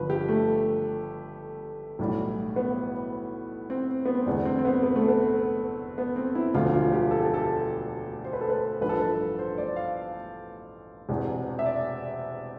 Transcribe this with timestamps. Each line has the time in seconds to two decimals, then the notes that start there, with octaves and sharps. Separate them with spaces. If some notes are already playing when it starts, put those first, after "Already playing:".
Already playing: G1 G2 F3 B4
0.10 G4
0.28 A3
1.99 B1 A2 E3 G3
2.56 B3
3.70 C4
4.05 B3
4.15 C4
4.26 F1 E2 D3 G3 D4
4.45 C4
4.59 C4
4.65 B3
4.83 B3
4.96 A3
5.08 B3
5.98 B3
6.16 C4
6.35 E4
6.54 E1 D2 D3 F3 F4
6.73 F4
6.92 G4
7.11 A4
7.22 G4
7.34 A4
8.24 C5
8.33 B4
8.41 A4
8.49 B4
8.81 A1 G2 F3 B4
8.89 A4
8.98 B4
9.39 C5
9.58 D5
9.76 F5
11.09 E1 E2 C3
11.59 E5
11.66 D5